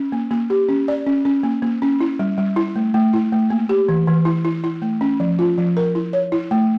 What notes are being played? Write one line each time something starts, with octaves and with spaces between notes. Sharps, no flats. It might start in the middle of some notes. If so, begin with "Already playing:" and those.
Already playing: C#4
A#3
A#3
G4
C#4
D5
C#4
C#4
A#3
A#3
C#4
E4
G3
G3
E4
A3
A3
E4
A3
A#3
G4
E3
E3
E4
E4
E4
A3
C#4
F3
F4
F3
A#4
E4
C#5
E4
A3